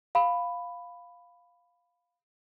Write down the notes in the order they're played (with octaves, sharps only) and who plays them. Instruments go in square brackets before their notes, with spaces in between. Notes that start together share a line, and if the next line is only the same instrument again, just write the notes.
[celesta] F5 B5